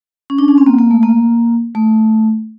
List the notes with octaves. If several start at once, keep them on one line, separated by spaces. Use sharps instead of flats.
C#4
D4
C#4
C4
A#3
A#3
A3
A#3
A3